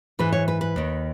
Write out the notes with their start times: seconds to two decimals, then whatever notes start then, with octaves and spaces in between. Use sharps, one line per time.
0.19 G#2 E3 B4
0.32 C#5
0.48 B4
0.61 B4
0.76 D#2 D#3